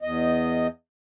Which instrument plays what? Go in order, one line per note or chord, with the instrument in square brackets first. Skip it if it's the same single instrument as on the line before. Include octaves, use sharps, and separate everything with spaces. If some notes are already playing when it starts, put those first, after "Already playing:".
[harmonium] E2 D#5